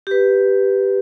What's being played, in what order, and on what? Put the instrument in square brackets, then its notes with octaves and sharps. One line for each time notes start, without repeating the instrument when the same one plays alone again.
[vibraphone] G4 B4